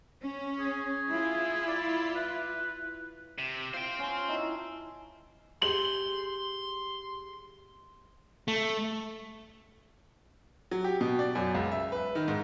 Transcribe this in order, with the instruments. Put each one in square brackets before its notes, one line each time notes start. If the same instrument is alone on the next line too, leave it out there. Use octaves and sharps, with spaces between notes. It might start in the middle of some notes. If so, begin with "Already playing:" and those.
[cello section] C#4
[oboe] G#4
[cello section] E4 F4
[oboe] D5
B4
[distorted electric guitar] C3
[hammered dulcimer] F4 [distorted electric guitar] C5 G5
[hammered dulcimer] C#4 C6
D#4 E4 A5
[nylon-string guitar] G4 G#4 [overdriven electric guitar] C6 [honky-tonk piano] F#7
[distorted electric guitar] A3
[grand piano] F#3
G4
B2
D5
F#2
C#2
E5
B4
D#3
G#2